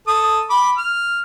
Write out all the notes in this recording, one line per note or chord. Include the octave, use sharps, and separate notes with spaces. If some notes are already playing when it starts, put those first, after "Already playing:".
A4 D#6
B5 D6
F6